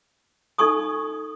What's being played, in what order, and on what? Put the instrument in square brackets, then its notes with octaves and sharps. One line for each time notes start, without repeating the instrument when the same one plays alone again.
[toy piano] D#4 A4 G#5 C#6 D#6